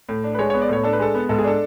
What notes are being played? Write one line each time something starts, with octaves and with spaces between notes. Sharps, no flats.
A2
D4
B4
G#3 C#5
C#5
B3
D5
A2 C#5
D4 A4
B4
G#3 A4
B3
G#2 A4
G#4
D4 A4